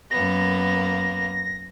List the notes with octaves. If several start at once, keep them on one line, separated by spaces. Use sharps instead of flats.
F#2 A#3 B3 A#6